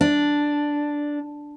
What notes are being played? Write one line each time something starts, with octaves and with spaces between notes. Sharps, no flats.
D4